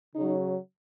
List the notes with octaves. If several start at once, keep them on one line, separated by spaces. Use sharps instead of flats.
C#3 F#3 D#4